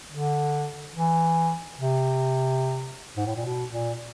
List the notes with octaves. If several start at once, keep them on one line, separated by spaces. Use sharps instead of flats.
D3
E3
C3
G#2
A2
A#2
B2
A#2